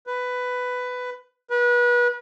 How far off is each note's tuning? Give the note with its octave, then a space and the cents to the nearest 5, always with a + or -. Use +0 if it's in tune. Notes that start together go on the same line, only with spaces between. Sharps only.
B4 +10
B4 -30